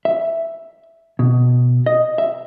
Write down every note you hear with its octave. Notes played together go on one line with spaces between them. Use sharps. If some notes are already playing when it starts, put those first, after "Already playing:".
E5
B2
D#5
E5